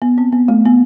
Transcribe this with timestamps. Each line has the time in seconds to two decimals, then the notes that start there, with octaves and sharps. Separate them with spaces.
0.02 B3
0.18 C4
0.32 B3
0.48 A3
0.66 B3